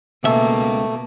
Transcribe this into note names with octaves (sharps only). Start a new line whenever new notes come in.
C#2 B2 A3 A#3 E5